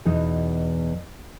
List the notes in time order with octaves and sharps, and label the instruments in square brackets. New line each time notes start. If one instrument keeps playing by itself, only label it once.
[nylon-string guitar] E2 B2 E3 D#4